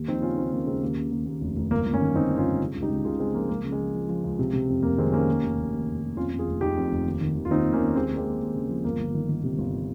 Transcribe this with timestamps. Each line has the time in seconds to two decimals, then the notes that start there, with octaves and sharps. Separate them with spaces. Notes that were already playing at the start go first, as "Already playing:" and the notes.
Already playing: D#2
0.08 F3 C4 D#4
0.22 C#3 C#4 F4
0.37 D#2 C4 D#4
0.52 D#2 A#3 C#4
0.67 C#3 G#3 C4
0.81 D#2 A#3
0.96 C#3
1.11 D#2
1.26 D#2
1.41 F1
1.56 F1
1.71 G1 A#3
1.86 G1
1.93 A#3 C#4
2.01 D#3
2.15 G1 C4 D#4
2.31 G2
2.38 C#4 F4
2.45 G2
2.60 C#3
2.75 C#2
2.82 D#4 G4
2.90 C#2
3.04 C#3 F4 G#4
3.19 C#3 G#3 C4
3.34 F3 A#3
3.49 C#2 A#3
3.64 C#3
3.72 G#3
3.79 F3
3.94 F3
4.09 F3
4.24 C#2
4.39 C3
4.53 C3
4.69 F2
4.83 F1 A#3
4.98 D#3 G#3 C4
5.12 D#3 A#3 C#4
5.28 D#2
5.43 F1
5.57 F1
5.72 D#2
5.88 F1
6.02 D#2
6.17 F2 C#4 F4
6.31 F2
6.39 F4 G#4
6.47 F1
6.61 F1 D#4 G4
6.77 F2
6.91 F1
7.06 D#2
7.21 D#3
7.36 D#2
7.45 F4
7.50 D#2 C4 D#4
7.65 D#2
7.73 A#3 C#4
7.81 D#2
7.88 C#4
7.95 D#2 G#3 C4
8.11 D#2 A#3
8.17 G#3 C4
8.25 D#2
8.40 D#2
8.54 C#3
8.69 F3
8.85 G1 A#3
8.99 G1
9.14 D#3
9.29 D#3
9.44 C3
9.58 G1